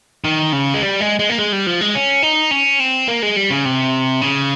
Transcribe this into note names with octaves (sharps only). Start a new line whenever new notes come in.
D#3
C#3
G#3
G3
G#3
G#3
A#3
G#3
G3
F3
G#3
C#4
D#4
C#4
C4
A#3
G#3
G3
C#3
C3
C#3